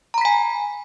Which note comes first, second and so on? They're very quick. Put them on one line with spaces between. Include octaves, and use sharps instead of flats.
A#5 B5 B6 G#5